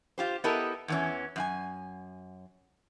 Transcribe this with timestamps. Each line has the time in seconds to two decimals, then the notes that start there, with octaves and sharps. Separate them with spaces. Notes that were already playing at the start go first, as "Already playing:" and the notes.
0.18 F4 G4 C5
0.44 B3 E4 G4 A4 A#4 D#5
0.88 E2 E3 C#4
1.36 F#2 F4 G#5